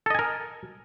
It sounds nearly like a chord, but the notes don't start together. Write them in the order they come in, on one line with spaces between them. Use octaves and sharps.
A4 D#5 G#5 A#4